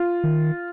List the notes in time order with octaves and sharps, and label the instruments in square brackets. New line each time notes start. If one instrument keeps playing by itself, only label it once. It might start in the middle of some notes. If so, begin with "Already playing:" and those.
Already playing: [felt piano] F4
[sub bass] D#3